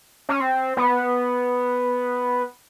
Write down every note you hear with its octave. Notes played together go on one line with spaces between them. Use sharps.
C#4
C4
B3